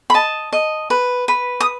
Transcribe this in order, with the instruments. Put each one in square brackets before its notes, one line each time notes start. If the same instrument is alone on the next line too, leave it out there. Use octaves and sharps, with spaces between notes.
[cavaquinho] B5
D#5 A5
D#5
B4
B4
D#6